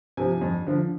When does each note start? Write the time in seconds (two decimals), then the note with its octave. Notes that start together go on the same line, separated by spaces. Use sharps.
0.17 C3 F3 G#5
0.41 F2
0.66 D3 F3